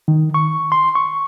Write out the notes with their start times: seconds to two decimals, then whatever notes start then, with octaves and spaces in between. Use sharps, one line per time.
0.08 D#3
0.34 C#6
0.72 C6
0.95 C#6